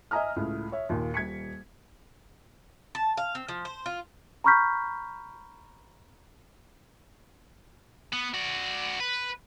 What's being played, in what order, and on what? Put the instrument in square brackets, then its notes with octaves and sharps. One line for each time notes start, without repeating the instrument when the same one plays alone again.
[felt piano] D#5 E5 G#5 A#5 D#6 F6
C#2 A2
C#5 E5
D#2 A#2
D#1 G#6 B6 C#7
[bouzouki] A5
F5
C4
F3
C5
F4
[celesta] A#5 B5 C#6 F6 G6 B6
[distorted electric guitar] B3
F#4 D5
B4